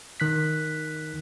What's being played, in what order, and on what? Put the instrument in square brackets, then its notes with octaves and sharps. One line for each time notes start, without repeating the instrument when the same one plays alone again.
[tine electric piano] D#3 F#6 B6